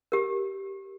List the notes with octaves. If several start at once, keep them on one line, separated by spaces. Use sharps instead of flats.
G4 A#4